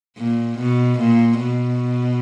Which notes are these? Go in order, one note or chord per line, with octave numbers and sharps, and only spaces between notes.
A#2
B2
A#2
B2